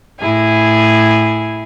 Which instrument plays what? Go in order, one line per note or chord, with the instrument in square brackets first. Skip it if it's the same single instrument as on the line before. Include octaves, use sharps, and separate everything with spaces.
[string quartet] A2 E4 G#4 G#5